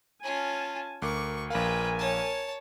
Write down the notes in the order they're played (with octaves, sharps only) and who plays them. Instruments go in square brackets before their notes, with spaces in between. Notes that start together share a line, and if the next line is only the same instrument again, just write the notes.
[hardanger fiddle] C#4 F4 [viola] G#5 A5
[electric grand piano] D2 D6 [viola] A#4 [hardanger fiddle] C#6
[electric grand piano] A#1 F5 [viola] A#4 G#5 [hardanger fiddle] B4 G5
[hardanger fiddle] C#5 A5